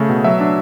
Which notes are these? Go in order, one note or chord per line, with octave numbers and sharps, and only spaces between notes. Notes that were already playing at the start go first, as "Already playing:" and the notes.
Already playing: C#3 A3
B2
F#3 E5
D4